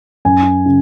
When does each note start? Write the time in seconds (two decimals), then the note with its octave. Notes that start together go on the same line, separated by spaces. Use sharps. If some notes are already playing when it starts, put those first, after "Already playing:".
0.25 F#2 G#5
0.66 C#3